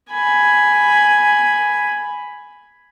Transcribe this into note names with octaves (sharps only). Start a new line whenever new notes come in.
G#5 B5